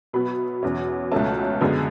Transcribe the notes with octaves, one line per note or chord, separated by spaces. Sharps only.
B2 F#3 B3 B5
E2 B2 F#3 C#4
C#2 B2 F#3 A3 C#4 A5
F#2 D3 G#3 B3